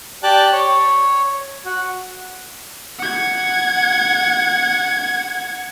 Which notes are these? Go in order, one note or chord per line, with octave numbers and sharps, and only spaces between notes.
G4 D5 G5 A5 F#6
C#5
F#4
F#5 G#6